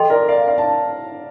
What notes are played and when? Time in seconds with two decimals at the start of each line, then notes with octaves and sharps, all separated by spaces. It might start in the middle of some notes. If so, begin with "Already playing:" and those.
Already playing: A4 D#5 G5 C6
0.10 A#4 D5
0.28 D5 F5
0.47 D5 F5
0.58 A5